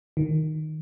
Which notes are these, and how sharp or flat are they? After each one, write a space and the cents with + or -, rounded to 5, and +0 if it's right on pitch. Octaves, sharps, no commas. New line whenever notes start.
D#3 -5